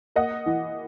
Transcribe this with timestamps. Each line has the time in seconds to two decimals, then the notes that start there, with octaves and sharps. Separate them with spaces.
0.16 A#3 D#5 F#5
0.46 E3